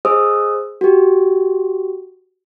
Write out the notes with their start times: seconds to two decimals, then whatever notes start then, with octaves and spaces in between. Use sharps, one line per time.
0.05 G#4 C5 D#5 D#6 E6
0.81 F#4 G4